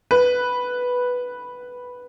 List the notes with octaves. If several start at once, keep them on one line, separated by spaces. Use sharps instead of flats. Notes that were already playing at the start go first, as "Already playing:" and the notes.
B4